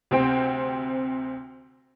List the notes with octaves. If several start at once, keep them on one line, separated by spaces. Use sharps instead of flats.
D2 C3 C4 G5